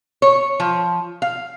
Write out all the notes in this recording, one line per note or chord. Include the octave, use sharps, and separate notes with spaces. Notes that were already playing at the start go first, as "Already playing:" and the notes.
C#5
F3
F5